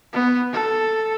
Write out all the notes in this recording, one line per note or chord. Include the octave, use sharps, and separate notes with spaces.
B3
A4